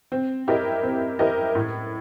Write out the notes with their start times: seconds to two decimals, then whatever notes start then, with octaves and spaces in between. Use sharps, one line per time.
0.12 C4
0.48 E4 G4 A#4 D#5
0.83 C4
1.19 E4 G4 A#4 D#5
1.55 A2